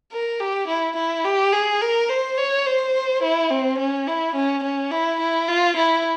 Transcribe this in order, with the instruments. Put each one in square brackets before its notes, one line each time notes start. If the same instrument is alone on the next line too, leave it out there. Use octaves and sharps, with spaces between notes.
[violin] A#4
G4
E4
E4
G4
G#4
A#4
C5
C#5
C5
E4
C4
C#4
E4
C#4
C#4
E4
E4
F4
E4